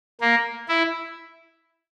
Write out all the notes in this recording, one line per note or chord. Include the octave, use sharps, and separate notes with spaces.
A#3
E4